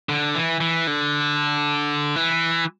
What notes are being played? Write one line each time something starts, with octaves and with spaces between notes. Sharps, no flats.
D3
E3
E3
D3
E3